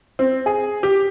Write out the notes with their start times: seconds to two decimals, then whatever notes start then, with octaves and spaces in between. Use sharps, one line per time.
0.19 C4
0.46 G#4
0.83 G4